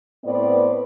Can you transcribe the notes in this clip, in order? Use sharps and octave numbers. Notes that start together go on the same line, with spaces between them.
A2 B3 C4 B4 C5 D5